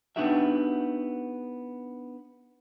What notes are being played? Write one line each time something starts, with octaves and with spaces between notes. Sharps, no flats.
B3 D4 D#4 F#4 G4 E5